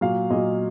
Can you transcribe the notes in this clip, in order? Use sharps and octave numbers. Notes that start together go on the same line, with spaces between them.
A#2 F#3 F5
A#2 F#3 D#5